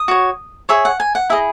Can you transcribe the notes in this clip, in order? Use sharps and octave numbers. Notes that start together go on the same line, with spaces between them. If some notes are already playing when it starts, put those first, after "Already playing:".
Already playing: D#6
F#4 C#5
G#4 C#5 E5
F#5
G#5
F#5
E4 G#4 D#5 E5